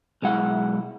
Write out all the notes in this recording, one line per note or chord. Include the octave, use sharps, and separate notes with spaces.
B1 G#3 E4 F#5